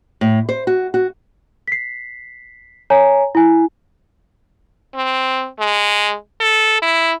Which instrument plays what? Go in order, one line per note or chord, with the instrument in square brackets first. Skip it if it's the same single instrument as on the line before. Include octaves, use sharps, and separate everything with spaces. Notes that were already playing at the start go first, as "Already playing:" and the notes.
[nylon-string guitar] A2
C5
F#4
F#4
[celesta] B6 C7
C#5 G#5 A#5
E4 G#5
[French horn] C4
G#3
A4
E4